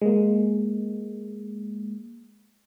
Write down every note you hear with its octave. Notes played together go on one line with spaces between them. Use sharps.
G#3 A#3